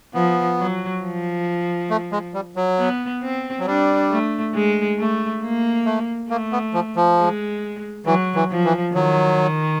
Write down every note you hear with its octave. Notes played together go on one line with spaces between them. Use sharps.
F3 B3
F#3
F3
A3
G#3
G3
F#3
B3
C4
F#3
G3 D4
A3
G#3
A3
A#3
A3
A3 A#3
B3
F3
F3
G#3
E3 F#3
E3
F3
E3
D#3 F#3